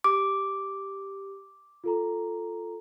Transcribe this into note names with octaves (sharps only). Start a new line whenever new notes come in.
G4 D6
F4 A4 A#5